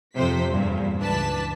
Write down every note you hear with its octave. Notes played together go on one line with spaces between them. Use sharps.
F2 C3 F3 C5 B6
E2 G2 A#2
C#2 E3 D4 B4 A5 B6